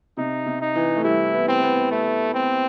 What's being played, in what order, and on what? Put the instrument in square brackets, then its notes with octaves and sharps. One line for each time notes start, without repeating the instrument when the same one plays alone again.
[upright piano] C3 [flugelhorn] D#4
[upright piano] C3
[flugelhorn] D#4
[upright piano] E3
A3
[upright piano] G3 [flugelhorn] E4
[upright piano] B3
[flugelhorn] C4
[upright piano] B3
[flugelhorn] A3
C4